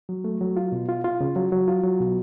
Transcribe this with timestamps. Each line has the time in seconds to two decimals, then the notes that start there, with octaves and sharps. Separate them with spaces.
0.09 F#3
0.24 A3
0.41 F#3
0.57 F4
0.72 B2
0.89 F4
1.04 F4
1.21 C#3
1.36 F#3
1.52 F#3
1.68 F4
1.84 F#3
2.00 B2